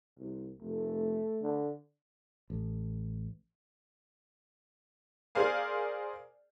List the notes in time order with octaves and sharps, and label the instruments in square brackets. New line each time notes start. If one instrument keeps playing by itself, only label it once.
[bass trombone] C2
[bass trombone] F1 [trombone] A3
[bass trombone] D3
[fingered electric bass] A1
[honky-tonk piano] G#4 A#4 C5 D5 F5 G#5